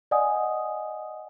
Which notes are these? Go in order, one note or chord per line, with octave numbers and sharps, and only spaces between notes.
D5 D#5 F#5 G#5 D#6